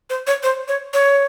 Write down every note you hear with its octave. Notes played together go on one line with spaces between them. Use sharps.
C5
C#5
C5
C#5
C#5